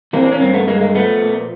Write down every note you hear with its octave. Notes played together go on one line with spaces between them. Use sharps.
E3 A#3 C4
D4
C#4
G2 A#3 C4
A3 B3
G2 G#3 A#3
G#3 A#3
F3 A3 B3
A#2